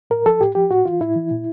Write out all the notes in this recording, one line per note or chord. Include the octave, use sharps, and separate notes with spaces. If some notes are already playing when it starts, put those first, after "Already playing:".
A2 A#4
F3 A4
A2 G4
F3 G4
A2 F#4
E3 F4
A2 E4
E3
A#2